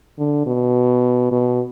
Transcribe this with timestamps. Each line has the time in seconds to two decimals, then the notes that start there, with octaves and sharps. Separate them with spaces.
0.19 D3
0.47 B2
1.32 B2